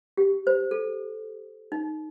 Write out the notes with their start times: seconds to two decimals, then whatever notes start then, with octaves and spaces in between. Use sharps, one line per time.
0.17 G4
0.47 C5
0.71 A4
1.72 D#4